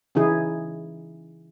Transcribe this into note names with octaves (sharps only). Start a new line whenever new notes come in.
C#3 E3 D#4 E4 G#4